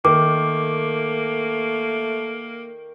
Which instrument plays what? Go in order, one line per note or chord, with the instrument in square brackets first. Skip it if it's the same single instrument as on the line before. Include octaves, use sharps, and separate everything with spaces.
[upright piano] D#3 [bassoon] A3 [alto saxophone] A#3 [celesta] D6